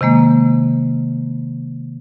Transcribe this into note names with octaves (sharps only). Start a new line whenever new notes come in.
C3 D#3 G#3 A#3